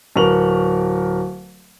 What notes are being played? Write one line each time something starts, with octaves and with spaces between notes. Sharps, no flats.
D1 A#4 B4 C#6 F7 F#7